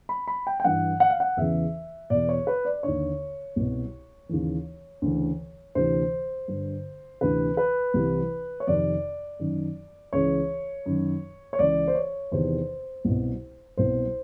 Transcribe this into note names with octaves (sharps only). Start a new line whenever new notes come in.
B5
B5
G5
G5
G2 E3 F#5
F#5
F5
F#5
E2 C#3 E3 E5
E2 B2 D5
C#5
B4
D5
D#2 D3 C#5
C2 B2
D#2 C#3 E3
D2 C#3 E3
D2 C3 E3 C5
G2 D3
D2 C3 E3 B4
B4
C2 C3 E3
C#5
F2 C3 D#3 D5
F#2 D#3
C#2 C#3 E3 C#5
F#2 D#3
C#5
C#2 C#3 E3 D5
C5
C#5
E2 C3 D#3 C5
C2 B2
C2 B2 C5